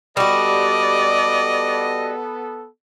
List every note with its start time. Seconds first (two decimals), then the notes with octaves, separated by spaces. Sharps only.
0.17 G3 B3 F#4 A4 D5 D#5